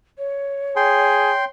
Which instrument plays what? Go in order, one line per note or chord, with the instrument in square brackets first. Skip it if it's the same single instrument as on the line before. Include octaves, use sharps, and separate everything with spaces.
[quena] C#5
[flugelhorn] G#4 [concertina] G5 C6